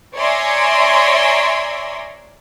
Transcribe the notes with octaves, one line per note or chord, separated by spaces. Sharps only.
C#5 D5 E5 G#5 A#5 C6